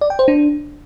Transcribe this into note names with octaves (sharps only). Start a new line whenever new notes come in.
D5
G5
C5
D4